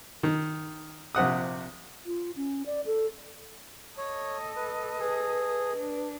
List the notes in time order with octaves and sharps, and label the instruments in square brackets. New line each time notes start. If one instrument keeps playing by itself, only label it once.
[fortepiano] D#3
A#1 C3 F#5 D#6
[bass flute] F4
C#4
D5
A4
[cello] A4 D#5 [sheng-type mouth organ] C#5
[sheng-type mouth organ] B4
[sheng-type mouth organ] G#4 [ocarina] B4
[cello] D4